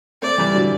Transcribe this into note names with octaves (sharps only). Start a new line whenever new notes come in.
A3 C4 D5
E3 G3
D3 F#3